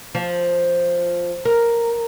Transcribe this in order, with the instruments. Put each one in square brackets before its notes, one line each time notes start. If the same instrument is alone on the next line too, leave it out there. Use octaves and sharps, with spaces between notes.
[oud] F3
A#4